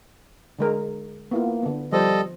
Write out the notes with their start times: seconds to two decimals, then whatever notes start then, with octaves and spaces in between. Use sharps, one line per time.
0.59 D3 G#3 A#4
1.31 A#3 B3 E4 F4
1.63 D3 B3
1.92 F3 G3 A4 C5 D#5